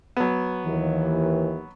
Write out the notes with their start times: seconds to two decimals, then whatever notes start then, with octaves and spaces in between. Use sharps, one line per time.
0.17 F#3 B3
0.66 D#2 E3